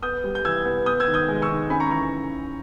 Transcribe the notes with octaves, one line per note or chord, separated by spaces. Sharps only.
B3 D#6 G6
G3
G6
E3 E6 G#6
B3
B3 D#6 G6
E6 G#6
D#3
D#6 G6
G#3
C#6 E6
D#3
C#4 G#5 B5
A#5 C#6
E3 A#5 C#6